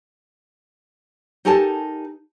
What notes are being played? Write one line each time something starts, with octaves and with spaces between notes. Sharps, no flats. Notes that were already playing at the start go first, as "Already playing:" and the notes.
D#4 G4 A4 A#4 G#5 A5